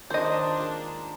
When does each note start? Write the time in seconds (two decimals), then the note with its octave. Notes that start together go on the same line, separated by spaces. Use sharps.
0.10 D#3 F3 D4 C5 D#5
0.57 G#3 A#3